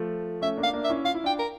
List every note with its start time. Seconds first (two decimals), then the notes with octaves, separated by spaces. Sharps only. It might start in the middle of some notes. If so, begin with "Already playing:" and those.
Already playing: F3 A3
0.41 A3 C#4 E5
0.57 A#3 D4
0.63 F5
0.73 A#3 D4
0.84 E5
0.90 C#4 E4
1.04 F4 F5
1.14 E4
1.24 D4 F4 G5
1.39 A#4